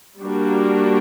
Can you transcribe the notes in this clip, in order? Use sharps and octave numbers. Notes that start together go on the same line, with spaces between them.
G3 A#3 D4 F#4 A#4